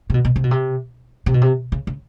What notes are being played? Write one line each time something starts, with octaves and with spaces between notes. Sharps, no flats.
C3
B2
B2
C3
B2
C3
C3
B2
C3
C#3
C#3